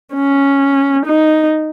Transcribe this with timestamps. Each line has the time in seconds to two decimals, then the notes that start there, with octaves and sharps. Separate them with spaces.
0.15 C#4
1.06 D#4